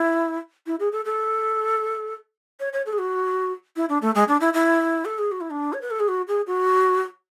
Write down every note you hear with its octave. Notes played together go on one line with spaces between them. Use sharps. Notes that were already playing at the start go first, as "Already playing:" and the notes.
Already playing: E4
E4
G#4
A4
A4
C#5
C#5
A4
G#4
F#4
E4
D4
A3
G#3
D4
E4
E4
A4
G#4
F#4
E4
D4
C#5
B4
A4
G#4
F#4
G#4
F#4